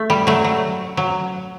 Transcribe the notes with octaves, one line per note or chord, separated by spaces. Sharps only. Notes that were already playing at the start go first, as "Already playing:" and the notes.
Already playing: A3
G3
F#3 A3
F#3
F#3